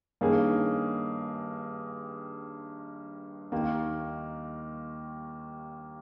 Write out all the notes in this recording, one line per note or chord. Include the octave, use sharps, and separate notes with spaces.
G2 D#3 A#3 C#4 G#4
D#2 D#3 A#3